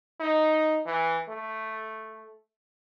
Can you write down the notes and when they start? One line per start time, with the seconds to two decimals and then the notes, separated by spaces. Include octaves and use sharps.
0.20 D#4
0.86 E3
1.29 A3